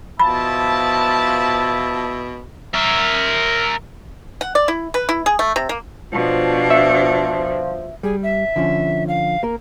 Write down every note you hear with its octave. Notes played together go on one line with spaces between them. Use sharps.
B2 F3 E4 A5 B5
A#4 E5
F#5
D5
E4
B4
E4
G#4
A3
C3
A#3
B2 F3 D4
E5
G3 G#4
E5
D3 F3 C#4
F5
A#3 A#4